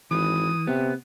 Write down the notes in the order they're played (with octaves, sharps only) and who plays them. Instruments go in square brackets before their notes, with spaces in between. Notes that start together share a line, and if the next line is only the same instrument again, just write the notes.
[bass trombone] G#1 [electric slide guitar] E3 [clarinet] D#6
[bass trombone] C3 [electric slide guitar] B3